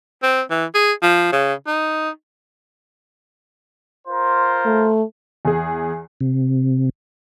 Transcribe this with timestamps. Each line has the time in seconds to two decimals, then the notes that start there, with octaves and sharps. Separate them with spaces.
0.23 C4
0.50 E3
0.74 G#4
1.02 F3
1.32 C#3
1.67 D#4
4.08 F4 A#4 C5
4.66 A3
5.45 E2 G#4
6.21 C3